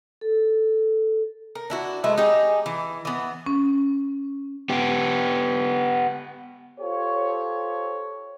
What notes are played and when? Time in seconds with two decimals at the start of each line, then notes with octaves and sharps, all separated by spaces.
0.21 A4
1.55 A#4
1.70 D4 E4 F#4
2.04 G#3 A3 B4 E5
2.18 D#4 G4 G#4
2.66 E3
3.05 E3 B3
3.46 C#4
4.69 B3 G4
6.79 F4 G4 A4 C5 C#5